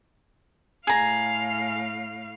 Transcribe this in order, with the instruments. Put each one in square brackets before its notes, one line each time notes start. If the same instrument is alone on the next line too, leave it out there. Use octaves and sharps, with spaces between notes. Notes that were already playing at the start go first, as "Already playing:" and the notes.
[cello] A2 F5 [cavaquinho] G#4 A#5